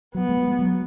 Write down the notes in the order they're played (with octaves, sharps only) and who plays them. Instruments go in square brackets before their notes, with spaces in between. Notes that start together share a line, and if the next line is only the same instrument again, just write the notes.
[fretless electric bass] F#3 [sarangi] B3
[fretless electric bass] G#3
F#3
G#3
F#3